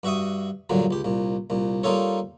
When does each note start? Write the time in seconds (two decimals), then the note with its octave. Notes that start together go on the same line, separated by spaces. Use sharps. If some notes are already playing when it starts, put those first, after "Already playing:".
0.03 G2 F#4 E5 C#6 D#6
0.70 G2 A#2 D3 F#3
0.91 C#2 G4
1.04 C2 A#2
1.50 C2 A#2
1.83 G3 A#3 D#4 F4 A4 C#5